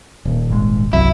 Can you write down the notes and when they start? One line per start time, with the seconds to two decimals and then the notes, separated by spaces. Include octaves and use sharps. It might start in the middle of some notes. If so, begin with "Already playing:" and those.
0.25 D#1
0.50 G#1 G#3
0.93 G1 C2 F#3 E4